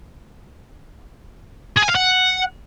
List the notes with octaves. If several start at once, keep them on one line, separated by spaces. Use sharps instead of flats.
G#4
G#5
F5
F#5